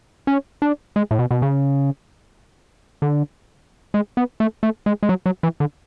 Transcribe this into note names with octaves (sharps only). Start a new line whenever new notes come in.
C#4
D4
G#3
A2
B2
B2
C#3
D3
G#3
B3
A3
A3
G#3
G#3
F#3
F#3
E3
D3